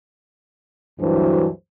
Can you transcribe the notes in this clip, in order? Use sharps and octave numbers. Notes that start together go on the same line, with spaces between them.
D2 G2 E3 F#3 A3 C5